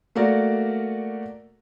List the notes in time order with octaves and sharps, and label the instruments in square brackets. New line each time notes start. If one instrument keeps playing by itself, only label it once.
[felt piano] A3 A#3 F#4 A#4 D5